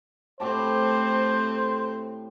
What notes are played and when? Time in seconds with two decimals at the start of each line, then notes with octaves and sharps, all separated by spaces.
0.40 A2 A3 C4 G4 C5 A5